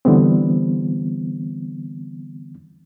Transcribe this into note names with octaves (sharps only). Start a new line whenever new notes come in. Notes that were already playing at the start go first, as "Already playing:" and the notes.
D3 E3 G3 B3 C4